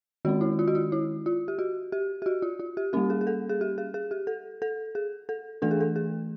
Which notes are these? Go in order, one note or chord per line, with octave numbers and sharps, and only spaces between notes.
D#3 G#3 C#4 F#4
E4
F4
F#4
F4
E4
F4
G4
F#4
G4
G4
F#4
F4
F4
G4
G3 A#3 C#4 G4
G#4
G#4
A4
G#4
G4
G#4
G#4
G4
A4
A4
G#4
A4
E3 A3 D4 A4
G#4
A4
G#4